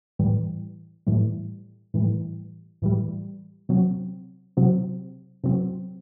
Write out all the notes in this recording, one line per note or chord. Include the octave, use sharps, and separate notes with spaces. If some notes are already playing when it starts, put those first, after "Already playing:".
A2 E3 G3
A2 E3 G3
A2 E3 G3
A2 E3 G3
C3 F#3 C4
C3 F#3 C4
C3 F#3 C4